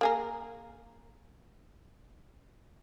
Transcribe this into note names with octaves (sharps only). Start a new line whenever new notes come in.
A#3 G#4 A#4